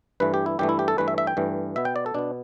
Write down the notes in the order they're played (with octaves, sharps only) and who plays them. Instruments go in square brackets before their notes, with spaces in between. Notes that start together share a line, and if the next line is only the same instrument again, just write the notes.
[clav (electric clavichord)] G2 E3 A3 B4
G4
E4
G2 E3 A3 G4
E4
G4
A4
G2 E3 A3 B4
E5
E5
G5
G2 E3 A3
B2 B3 E5
G5
D5
A4
B2 B3 D4